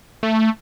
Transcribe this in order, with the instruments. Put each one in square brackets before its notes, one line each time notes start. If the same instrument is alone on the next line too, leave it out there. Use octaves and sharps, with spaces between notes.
[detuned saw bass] A3